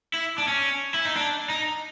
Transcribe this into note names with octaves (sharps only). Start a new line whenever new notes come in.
E4
D4
C#4
E4
D#4
D4
D#4